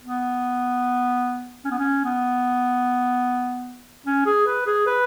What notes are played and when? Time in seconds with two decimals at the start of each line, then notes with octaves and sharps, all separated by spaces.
0.03 B3
1.65 C#4
1.71 B3
1.78 C#4
2.04 B3
4.07 C#4
4.26 G#4
4.47 B4
4.67 G#4
4.87 B4